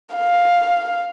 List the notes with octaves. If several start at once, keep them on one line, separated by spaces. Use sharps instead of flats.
F5